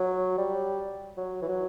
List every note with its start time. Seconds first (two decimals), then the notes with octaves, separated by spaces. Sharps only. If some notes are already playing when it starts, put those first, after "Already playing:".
Already playing: F#3
0.38 G3
1.17 F#3
1.42 E3
1.48 F#3